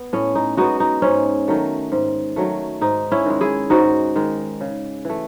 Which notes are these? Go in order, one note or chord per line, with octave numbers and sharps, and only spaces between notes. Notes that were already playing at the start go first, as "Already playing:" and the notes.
Already playing: B3
A2 C#4
D#4
G#3 B3 D#4 F#4
D#4
G#2 C#4
D#3 F#3 A3
G#2
D#3 F#3 A3
G#2 D#4
C#4 E4
D#3 G#3
E4 G#4
G#2 D#4 F#4
D#3 G#3
C#3
E3 A3